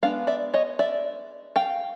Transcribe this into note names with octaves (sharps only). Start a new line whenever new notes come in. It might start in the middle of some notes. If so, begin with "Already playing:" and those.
G#3 B3 D4 F5
D5 E5
C#5 D#5
D5 E5
F5 G5